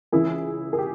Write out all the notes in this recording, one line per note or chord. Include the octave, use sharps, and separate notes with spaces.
C#2 C#3 E3 E4 G#4
G#4
G4